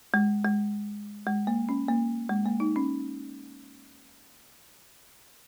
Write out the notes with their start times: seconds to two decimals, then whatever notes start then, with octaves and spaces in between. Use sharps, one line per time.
0.14 G#3
0.44 G#3
1.27 G#3
1.47 A#3
1.69 C#4
1.88 A#3
2.29 G#3
2.46 A#3
2.60 D#4
2.76 C#4